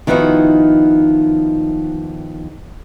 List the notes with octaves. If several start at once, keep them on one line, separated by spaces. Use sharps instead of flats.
D#3 F3 B3 D#4 E4 F#4